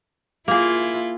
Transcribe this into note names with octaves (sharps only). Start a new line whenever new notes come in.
A#3 E4 F4 G#4